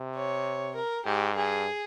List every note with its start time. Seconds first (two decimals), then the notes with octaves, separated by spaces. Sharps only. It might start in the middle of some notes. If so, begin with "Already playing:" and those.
Already playing: C3
0.16 C#5
0.75 A#4
1.06 G#2 G4
1.36 G2 G#4